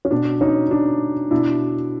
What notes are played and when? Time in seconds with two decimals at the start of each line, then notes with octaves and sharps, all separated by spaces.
0.05 C#4
0.11 B2 D4
0.41 C#4 D#4
0.71 D4
1.31 B2 D4 E4